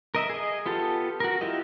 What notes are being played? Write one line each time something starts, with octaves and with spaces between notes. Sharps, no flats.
A#4 D#5 E5
G#4 D#5
B3 F4 G4 A4
F#4 A#4
E4 F4 G4 D#5